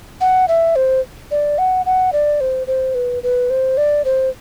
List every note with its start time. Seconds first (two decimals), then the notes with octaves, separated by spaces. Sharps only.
0.21 F#5
0.48 E5
0.76 C5
1.31 D5
1.58 F#5
1.86 F#5
2.13 D5
2.41 C5
2.67 C5
2.95 B4
3.23 B4
3.50 C5
3.77 D5
4.05 C5